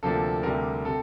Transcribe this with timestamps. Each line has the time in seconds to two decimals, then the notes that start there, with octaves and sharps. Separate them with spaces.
0.03 D2 C3 F3 A#3 D4 A4
0.43 D2 C3 G3 D4 A#4
0.85 C3 A4